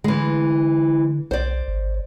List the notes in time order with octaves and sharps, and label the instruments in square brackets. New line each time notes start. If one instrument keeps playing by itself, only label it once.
[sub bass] D3 [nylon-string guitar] E3 G#3
[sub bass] B1 [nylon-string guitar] C5 D5
[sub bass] G#1